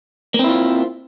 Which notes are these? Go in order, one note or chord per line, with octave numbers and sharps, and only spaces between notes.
A#3 C4 E4 F4